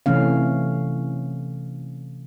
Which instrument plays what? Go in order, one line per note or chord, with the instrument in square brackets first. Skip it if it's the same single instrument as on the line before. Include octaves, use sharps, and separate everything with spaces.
[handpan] C3 E3 A3 C#4 F5